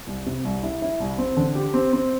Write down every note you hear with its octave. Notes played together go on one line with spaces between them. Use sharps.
C2
C3
C2
E4
E4
C2
C4
D3
G4
C4
C4